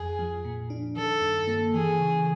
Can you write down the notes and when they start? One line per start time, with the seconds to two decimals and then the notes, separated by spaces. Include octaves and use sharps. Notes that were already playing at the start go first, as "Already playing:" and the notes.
Already playing: F2 G#4
0.19 F3
0.45 A#2
0.70 D4
0.96 D#3 A4
1.21 G2
1.47 A#3
1.73 E3 G#4
1.99 C#3